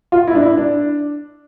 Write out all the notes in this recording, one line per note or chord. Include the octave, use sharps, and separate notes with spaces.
F4
E4
D4
E4
D4